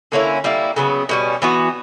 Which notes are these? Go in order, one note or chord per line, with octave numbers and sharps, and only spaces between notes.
D3 A#3 C#4 E4
G3 A#3 E4
C#3 F#3 B3
B2 G3 C#4
E3 B3 F#4